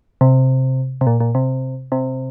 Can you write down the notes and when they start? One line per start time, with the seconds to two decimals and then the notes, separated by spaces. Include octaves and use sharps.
0.21 C3
1.01 C3
1.07 A#2
1.20 A#2
1.35 C3
1.92 C3